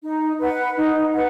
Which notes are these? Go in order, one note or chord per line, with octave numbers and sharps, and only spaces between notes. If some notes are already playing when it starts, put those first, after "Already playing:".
D#4
B4 F#5
D#4
B4 F#5